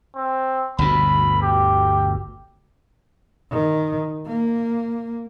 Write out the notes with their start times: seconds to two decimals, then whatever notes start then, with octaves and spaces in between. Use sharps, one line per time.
0.15 C4
0.78 G1 D2 B2 B5
1.42 G4
3.51 D#3
4.26 A#3